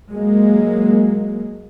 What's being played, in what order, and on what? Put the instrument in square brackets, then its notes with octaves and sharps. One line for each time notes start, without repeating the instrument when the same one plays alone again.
[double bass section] F#3 G#3 A#3